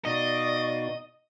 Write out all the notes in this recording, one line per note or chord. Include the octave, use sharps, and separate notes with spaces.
B2 D#4 D5 D#5 F5 C#6